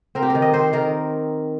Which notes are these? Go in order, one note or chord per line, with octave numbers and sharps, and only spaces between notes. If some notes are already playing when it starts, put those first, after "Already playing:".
C4 A#4
G4
A#4
D#3
D#5
C4 C5
D#3 A#4